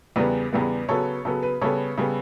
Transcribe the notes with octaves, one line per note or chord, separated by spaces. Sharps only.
E2 C#3 G3 B3 B4 D5
E2 C#3 G3 B3
C#3 F#3 B3 A4 C#5
C#3 F#3 B3 A4
B4
C#3 G3 B3 A4 C#5
C#3 G3 B3